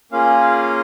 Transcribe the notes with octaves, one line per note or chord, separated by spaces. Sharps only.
A#3 C#4 F4 G#4 F5